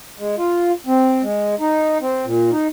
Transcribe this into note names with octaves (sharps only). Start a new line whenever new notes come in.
G#3
F4
C4
G#3
D#4
C4
A#2
D#4